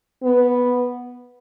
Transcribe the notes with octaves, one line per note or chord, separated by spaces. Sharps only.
B3